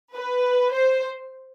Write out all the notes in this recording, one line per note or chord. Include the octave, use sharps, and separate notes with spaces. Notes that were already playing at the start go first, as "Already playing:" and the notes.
B4
C5